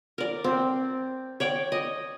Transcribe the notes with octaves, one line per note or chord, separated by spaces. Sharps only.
A#4 D5
C4
C#5 D5 G5
D#5